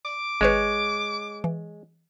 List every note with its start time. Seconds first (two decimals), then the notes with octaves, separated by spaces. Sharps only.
0.05 D6
0.41 G#1 G#3 B4 C#5
1.44 E3